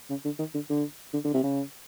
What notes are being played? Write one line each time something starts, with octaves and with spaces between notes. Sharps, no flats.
C#3
D3
D#3
D3
D3
D3
D3
C3
C#3